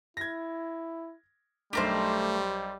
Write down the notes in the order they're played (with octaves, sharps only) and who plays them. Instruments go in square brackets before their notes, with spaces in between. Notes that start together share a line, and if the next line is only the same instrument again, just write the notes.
[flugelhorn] E4 [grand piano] G#6 A#6
[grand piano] B1 D4 [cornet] G3 [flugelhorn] A3 [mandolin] G4 A#4 C5